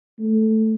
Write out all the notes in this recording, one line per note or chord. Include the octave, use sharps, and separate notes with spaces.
A3